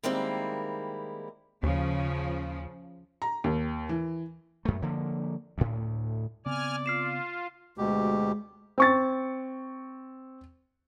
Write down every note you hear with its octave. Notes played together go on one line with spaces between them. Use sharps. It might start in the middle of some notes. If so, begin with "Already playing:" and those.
D#3 G3 G#3 A#3 C4 E4
D#2 C#3 F3
A#5
D#2
E3
F#2 A3
D3 F3 A#3
D2 A2
C#3 B3 C4 D5 G#5 F6
F4 F6 C7 E7
D2 B2 G#3 G4
C4 C#6 A6